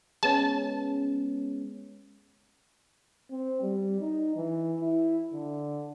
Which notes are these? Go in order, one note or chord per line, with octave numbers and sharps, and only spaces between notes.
G#3 B3 C#4 A5
C4
G3
D#4
E3
E4
D3